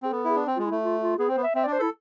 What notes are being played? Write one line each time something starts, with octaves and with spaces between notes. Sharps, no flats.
C4 G#4
B3 A4
E4 G#4
D4
C4
G#3 F4
E4
A3
F4
F4
B3 G#4
C4 C5
B3
E5
C4 E5
D5
D4
C5
E4 A4